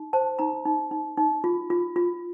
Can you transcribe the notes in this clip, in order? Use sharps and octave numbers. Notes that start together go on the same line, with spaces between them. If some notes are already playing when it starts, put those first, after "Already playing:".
Already playing: D#4
C5 A5
D#4 A#5
D#4
D#4
D#4
F4
F4
F4